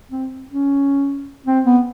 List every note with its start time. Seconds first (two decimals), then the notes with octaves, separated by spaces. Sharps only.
0.11 C4
0.50 C#4
1.46 C4
1.65 B3